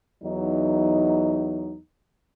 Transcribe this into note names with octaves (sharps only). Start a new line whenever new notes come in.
E2 F#3 D#4